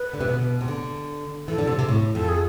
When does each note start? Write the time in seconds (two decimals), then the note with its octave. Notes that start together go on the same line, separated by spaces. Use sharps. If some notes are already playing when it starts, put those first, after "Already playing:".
Already playing: B4
0.13 D3
0.21 C3
0.28 B2
0.61 C3
0.68 D3
1.48 E3 A4
1.58 D3
1.67 C3
1.79 C3
1.89 A2
2.15 F2 A4
2.29 G#4